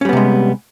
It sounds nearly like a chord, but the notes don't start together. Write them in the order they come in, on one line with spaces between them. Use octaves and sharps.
C#4 G3 B3 C3 G#3